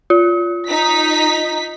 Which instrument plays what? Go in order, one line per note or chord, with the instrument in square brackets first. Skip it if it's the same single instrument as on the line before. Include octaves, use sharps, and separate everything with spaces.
[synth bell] F4
[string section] D#4 B6